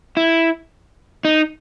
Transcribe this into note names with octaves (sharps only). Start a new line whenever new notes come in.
E4
D#4